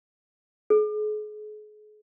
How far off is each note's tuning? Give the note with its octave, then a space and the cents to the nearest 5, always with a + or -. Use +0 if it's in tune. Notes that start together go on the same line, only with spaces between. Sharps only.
G#4 +40